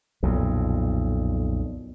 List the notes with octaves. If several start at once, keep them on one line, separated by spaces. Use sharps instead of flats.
B1 F2 A#2